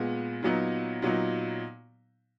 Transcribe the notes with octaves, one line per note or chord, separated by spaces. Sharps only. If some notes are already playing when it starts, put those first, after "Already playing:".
Already playing: A#2 G#3 B3
A#2 F#3 B3 D#4
A#2 F#3 B3 D#4